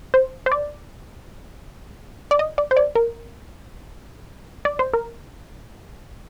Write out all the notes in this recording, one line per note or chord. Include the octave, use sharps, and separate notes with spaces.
C5
C5
D5
D5
D#5
D5
C5
D5
A#4
D5
C5
A#4